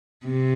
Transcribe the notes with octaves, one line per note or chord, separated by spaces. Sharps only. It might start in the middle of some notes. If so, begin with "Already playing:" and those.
C3